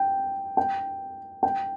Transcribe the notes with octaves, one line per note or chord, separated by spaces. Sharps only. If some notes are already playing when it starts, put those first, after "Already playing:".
Already playing: G5
G5
G5